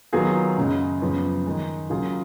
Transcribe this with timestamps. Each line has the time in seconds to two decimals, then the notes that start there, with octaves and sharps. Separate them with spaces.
0.13 D#3 F#3 B3 F4 G#4
0.57 F#2 C#3 G#3
1.02 F#2 C#3 F3 B3
1.46 D#3 G#3 D#4
1.90 C#3 F#3 A#3 F4 G#4